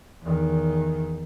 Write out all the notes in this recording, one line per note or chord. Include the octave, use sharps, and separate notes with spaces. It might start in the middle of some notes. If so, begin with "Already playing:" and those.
E2 D#3